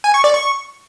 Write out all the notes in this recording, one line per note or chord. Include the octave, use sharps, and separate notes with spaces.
G#5
C#6
D5
C#6